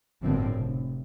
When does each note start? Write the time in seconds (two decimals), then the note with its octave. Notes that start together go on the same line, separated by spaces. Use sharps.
0.22 G1 F#2 A2 D3 F3 C4
0.53 F1